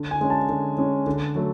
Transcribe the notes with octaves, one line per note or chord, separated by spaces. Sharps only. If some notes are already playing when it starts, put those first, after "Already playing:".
Already playing: D3
G#5
G#3 C#4
A5
D3
G#3 C#4
D3
F#3 A3